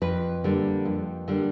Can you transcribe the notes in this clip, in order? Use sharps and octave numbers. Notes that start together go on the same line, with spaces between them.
F2 B4
D3 G3 A#3
F2
D3 G3 A#3